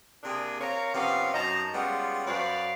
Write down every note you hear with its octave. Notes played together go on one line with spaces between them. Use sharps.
C3 A#3 D4 G#4
C4 A#4 C#5 F5 A#5
C3 F3 B3 C#4 F5
F#2 D#4 D#5 A5 A#5
G3 G#3 B3 C#4 F4
F#2 B4 C5 D5 F5